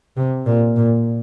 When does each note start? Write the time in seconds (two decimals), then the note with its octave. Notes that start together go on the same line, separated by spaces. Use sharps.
0.17 C3
0.46 A#2
0.76 A#2